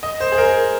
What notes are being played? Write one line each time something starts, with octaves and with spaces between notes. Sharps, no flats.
D#5
C5
G#4
A#4